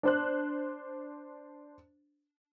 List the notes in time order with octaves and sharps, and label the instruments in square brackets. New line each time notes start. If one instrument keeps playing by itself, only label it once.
[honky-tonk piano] D4 C5 F#6